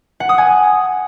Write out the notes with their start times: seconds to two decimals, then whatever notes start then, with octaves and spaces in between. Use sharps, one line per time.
0.20 F#5
0.29 D#6
0.38 G#5